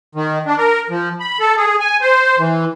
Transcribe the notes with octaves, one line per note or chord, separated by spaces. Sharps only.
D#3
D4
A#4
F3
B5
A4
G#4
G#5
C5
E3